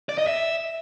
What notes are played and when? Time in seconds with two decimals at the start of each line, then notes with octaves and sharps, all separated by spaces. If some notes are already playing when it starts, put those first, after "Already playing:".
0.09 D5
0.18 D#5
0.27 E5